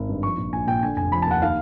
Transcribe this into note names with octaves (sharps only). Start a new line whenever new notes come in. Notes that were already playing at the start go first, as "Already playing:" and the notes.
Already playing: G#1
G2
F3 C#6
A#1
A#1 G#5
A#2 G5
D3 G#5
F1 G#5
F3 B5
A5
D#2 F#5
D#3 F5